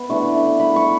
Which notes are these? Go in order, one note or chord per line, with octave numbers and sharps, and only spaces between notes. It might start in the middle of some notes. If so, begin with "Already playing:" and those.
Already playing: B3 B5
E3 A3 D4 C#6
B5
C#6